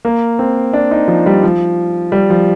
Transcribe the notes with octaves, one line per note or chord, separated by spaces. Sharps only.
A#3
C4
D4
D#4
F3
G3
F3
G3
F3